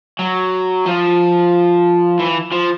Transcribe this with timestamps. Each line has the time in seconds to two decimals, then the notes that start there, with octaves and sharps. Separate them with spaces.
0.19 F#3
0.86 F3
2.19 E3
2.52 F3